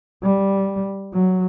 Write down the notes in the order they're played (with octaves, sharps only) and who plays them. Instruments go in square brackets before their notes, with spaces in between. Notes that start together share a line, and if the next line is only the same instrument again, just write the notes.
[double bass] G3
F#3